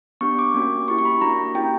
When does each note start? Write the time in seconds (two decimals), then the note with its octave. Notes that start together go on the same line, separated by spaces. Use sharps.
0.21 B3 D4 G4 C#6
0.39 D6
0.54 A#3 C#4 F#4
0.88 C#4 E4 G4 C#6
0.99 C#6
1.05 B5
1.21 A#3 D4 F#4 A#5
1.55 C#4 E4 G4 G5